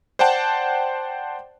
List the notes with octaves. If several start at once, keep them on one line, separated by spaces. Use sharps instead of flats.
C5 D5 F#5 G5 A5